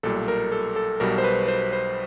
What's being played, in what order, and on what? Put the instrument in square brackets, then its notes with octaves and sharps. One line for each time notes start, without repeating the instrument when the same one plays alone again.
[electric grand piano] B1 A#2 G3 A4
A#4
A4
A4
B1 B2 G3 A#4
C5
B4
C5
C5